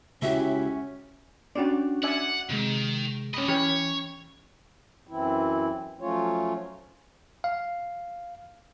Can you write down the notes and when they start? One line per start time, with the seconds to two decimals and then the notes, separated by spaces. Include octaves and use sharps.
0.22 C#2 C#4 E4 F#4 G4 E5
1.55 C#4 D4 F#4 G4 D5
2.03 D5 E5 F#5 G#5
2.50 C3 D#3 G#3
3.34 C#4 G4 D#5 B5
3.48 E3 C#4 G4 C#5 B5 G#6 B6
5.07 F#2 E3 C4 E4
6.00 F3 F#3 A3 C#4 F4 C#5
7.44 F5